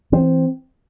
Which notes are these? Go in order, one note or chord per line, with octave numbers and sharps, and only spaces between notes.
E3 C4